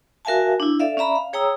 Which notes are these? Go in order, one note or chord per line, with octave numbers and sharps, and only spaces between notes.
F#4 A#4 E5 F5 G#5 A5
D4 E4
A4 D5 E5 F5
C#4 D5 E5 A#5 B5
F5
G#4 C#5 G5 A#5 D#6 E6